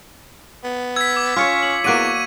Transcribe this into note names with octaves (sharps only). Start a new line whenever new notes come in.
B3
E6 G#6 B6
D6
C#4 F4 C#5 B6 C#7
F#7
E2 A#3 F#4 D5 C#6 D#7